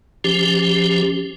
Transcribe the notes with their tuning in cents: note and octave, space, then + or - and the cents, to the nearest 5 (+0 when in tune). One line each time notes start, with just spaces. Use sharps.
F3 +0 C#4 +0 G4 +0